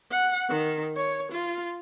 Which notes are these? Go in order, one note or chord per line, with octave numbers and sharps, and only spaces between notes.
F#5
D#3
C#5
F4